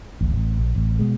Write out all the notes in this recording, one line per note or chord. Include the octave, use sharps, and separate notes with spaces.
D1 A1
A1
A#1
A1
B2 G#3